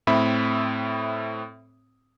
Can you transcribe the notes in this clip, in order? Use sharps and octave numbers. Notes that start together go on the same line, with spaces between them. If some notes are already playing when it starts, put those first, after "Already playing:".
A2 C4 E5 B5